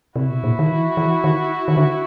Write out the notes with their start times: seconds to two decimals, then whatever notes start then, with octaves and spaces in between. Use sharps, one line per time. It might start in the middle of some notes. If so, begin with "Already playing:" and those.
0.16 C3 E4 F#4
0.30 B2
0.44 A#2
0.59 D#3
0.70 E3
0.97 E3
1.24 D#3
1.68 D#3
1.77 D3